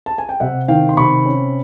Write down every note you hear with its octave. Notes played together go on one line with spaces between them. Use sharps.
A5
G#5
G5
C3 E5 F#5
D#3 F5 G5
C6
C3 B5 C#6
C#4